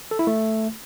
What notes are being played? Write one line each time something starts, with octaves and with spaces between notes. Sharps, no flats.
A4
E4
A3